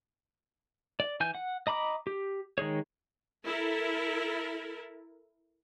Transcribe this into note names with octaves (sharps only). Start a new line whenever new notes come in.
D5
E3 G#5 G6
F#5
D#5 A#5 B5 D6
G4
D#3 G#3 G#4 C#5
E4 A4 A#4